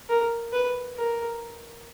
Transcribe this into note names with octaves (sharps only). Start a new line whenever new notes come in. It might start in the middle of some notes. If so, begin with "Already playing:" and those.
A#4
B4
A#4